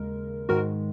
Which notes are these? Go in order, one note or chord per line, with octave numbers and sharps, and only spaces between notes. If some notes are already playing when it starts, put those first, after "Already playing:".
Already playing: D#2 C#3 G#3 A#4
G#2 D#3 G#3 F#4 A#4